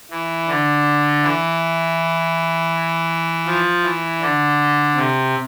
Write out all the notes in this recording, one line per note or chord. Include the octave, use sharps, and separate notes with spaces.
E3
D3
E3
F3
E3
D3
C3